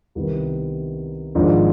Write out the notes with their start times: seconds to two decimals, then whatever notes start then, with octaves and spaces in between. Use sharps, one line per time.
0.15 C2 C3 D#3 B3
1.35 G#1 G#2 F3 G#3 D4